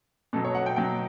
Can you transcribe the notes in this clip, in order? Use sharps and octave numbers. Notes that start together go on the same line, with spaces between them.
B2 F#3 A4
C#5
F#5
G5
B2 F#3 G5